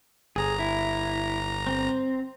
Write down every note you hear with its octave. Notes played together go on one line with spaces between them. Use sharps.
G1 G#4 A#5
E4
C4